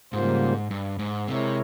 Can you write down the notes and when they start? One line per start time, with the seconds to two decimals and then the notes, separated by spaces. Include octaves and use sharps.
0.13 G#2 C#3 G3 A#3 F4 C5
0.71 G2
0.99 G#2
1.28 C3 G#3 E4 A#4 C#5